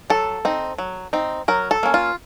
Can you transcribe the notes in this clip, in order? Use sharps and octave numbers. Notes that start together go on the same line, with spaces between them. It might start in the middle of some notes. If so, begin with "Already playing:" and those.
F#3 A4
C4 D#4
F#3
C4 D#4
F#3 A#4
A4
A#3 C#4
F4